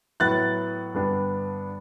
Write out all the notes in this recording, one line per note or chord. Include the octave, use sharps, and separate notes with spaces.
A2 F#3 B3 E4 F#6 A6
G2 D3 G3 B3 D4